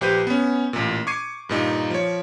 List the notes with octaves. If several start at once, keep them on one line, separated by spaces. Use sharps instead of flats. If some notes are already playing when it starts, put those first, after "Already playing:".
A#1 G4 B4 C5 G6 D#7
B3 C#4
A1 A#2
C#6 D6 G#6 C7 D#7
G2 A#2 D#4
F3 C#5